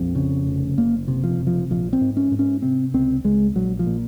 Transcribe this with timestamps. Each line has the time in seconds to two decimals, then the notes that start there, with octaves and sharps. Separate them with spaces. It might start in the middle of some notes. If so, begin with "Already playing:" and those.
Already playing: A#1 F2 C4
0.15 C#3
0.47 F1
0.78 F#1 A#3
1.08 C3
1.24 F3
1.39 F#1
1.47 F3
1.70 A#1 F3
1.93 C4
2.01 G#2
2.17 C#4
2.32 G#2
2.39 C#4
2.62 C3 C4
2.94 C#2 C4
3.24 C#2 G#3
3.56 A#1 F#3
3.79 F3
3.86 A#2